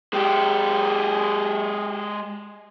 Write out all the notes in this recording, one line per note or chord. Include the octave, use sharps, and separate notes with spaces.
G#3 G4